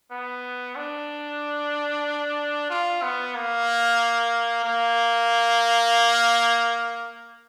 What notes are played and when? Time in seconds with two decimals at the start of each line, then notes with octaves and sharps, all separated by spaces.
0.11 B3
0.76 D4
2.70 F4
3.03 B3
3.35 A#3
4.65 A#3